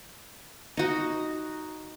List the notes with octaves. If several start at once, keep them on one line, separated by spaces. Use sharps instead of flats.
D#4 F#4